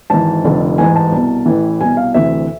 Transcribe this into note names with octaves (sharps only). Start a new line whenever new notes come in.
G#1 G#2 E3 A5
F1 F2 D3
A1 G#2 E3 G#5
A5
C2 B2
A1 A2 E3
C2 B2 G#5
F5
D2 C3 E3 E5